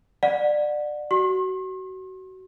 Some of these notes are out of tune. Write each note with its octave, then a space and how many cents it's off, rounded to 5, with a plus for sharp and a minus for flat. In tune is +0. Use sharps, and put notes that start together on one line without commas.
D5 +25 F#5 -20
F#4 +25 C6 +45